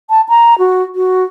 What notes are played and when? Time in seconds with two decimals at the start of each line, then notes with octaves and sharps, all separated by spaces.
0.10 A5
0.29 A#5
0.59 F#4
0.95 F#4